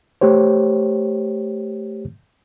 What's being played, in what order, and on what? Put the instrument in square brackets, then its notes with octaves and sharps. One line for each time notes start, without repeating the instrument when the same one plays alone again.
[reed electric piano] A3 G4 C5 C#5